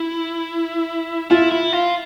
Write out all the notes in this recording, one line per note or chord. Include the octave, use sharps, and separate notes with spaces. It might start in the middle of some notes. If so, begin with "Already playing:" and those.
Already playing: E4
E4 F4
E4
F4